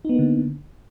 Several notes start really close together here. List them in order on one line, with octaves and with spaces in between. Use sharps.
D#4 B3 A#3 D3